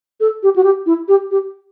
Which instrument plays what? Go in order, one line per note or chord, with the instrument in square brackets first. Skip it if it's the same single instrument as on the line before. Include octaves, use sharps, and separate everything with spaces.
[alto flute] A4
G4
F#4
G4
E4
G4
G4